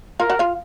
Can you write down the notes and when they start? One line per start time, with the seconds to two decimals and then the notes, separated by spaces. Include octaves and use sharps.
0.20 F4 A#4 F5
0.30 F#4 F#5
0.39 F4 F5